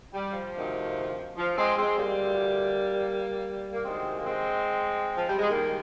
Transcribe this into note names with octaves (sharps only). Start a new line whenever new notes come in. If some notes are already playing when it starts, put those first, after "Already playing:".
G3
F3
D2 C3 D#3
F3
G#3 C4
G#3 C4
G3 A#3
D2 D3
A#3
D2 C3 D#3 G#3 C4
A#3
G#3 C4
F3
G3
G#3
D#2 D#3 G3 A#3